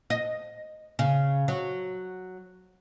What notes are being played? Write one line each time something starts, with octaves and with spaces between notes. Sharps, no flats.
D#5
C#3
F#3